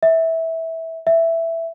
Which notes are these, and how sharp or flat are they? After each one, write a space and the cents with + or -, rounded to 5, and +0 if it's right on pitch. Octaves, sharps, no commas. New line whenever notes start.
E5 -15
E5 +5